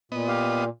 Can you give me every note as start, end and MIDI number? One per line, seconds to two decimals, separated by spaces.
0.12 0.69 46
0.12 0.64 59
0.12 0.64 75
0.28 0.65 67
0.28 0.65 77